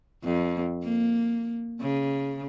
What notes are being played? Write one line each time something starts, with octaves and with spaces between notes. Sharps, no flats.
F2
A#3
C#3